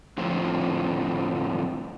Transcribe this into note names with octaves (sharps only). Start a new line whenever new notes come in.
F2 A2 D3 F3 C4